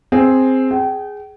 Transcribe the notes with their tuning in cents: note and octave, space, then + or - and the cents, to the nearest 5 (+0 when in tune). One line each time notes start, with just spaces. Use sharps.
C4 +0 G#4 +0
G#4 +0 G5 -35